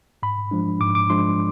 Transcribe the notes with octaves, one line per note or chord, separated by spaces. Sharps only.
G#2 B5
F3 G#3 D4
G#2 D6
D6
F3 G#3 D4 C6